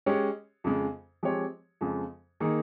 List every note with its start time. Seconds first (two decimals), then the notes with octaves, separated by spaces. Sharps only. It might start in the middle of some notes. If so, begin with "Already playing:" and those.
0.06 G#3 C#4 G4 C#5
0.64 F2 C#3 G#3
1.23 F3 G#3 C4 G4 C#5
1.81 F2 C#3 F3 G#3
2.40 D#3 A#3 D#4 G#4